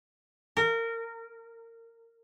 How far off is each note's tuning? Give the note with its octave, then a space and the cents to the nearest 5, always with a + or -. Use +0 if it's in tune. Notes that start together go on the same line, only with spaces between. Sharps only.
A#4 -25